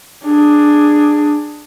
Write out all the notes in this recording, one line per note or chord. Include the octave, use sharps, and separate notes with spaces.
D4 G#4